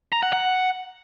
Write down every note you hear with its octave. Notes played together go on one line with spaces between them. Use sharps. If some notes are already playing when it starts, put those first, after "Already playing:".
A#5
F#5
F#5